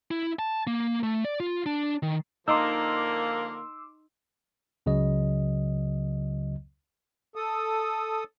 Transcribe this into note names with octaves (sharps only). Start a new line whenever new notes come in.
E4
A5
A#3
A3
D5
F4
D4
D#3
D3 F3 A#3 D#4 C6 D6 E6
C#2 C#3 F#3 D#5
A4 D#6